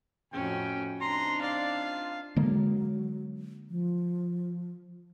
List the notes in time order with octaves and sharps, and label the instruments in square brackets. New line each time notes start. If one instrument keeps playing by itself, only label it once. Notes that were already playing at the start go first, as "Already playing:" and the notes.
[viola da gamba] F2 A2 F#4 [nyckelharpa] C#4 [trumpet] G5
[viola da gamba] C4 D4 D#4 [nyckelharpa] A#5 [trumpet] C6
[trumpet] D5 [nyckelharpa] F5
[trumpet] F4
[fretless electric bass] D3 G#3 A#3 [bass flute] F#3
[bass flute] F3